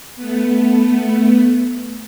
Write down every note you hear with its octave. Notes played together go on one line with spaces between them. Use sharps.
A3 B3